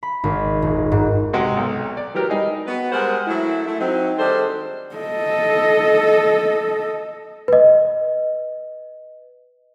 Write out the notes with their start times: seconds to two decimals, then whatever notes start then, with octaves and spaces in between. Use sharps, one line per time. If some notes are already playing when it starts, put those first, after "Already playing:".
0.03 B5
0.24 G#1
0.62 D#1
0.92 G#2
1.33 C3 F#3 G#3 F#4
1.57 B1
1.97 D5
2.15 E3 F#3 G4 A#4
2.30 G3 D#4 G#4
2.67 B3 F#4 B4
2.92 G3 G#3 G#4 A#4 C5 F#5
3.27 F#3 G#3 A3 E4
3.66 A3 E4
3.80 F#3 C4 D#4
4.19 D#3 G3 G#3 D4 A4 C5
4.95 A4 D#5
7.48 B4 D#5